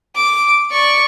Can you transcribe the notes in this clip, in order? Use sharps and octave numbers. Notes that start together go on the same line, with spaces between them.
D6
D5 C#6